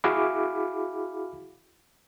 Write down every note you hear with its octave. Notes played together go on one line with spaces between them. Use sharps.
E4 F#4 G#4 F5 B5 D6